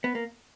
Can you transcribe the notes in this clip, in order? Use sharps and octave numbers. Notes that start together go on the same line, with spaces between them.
B3
A#3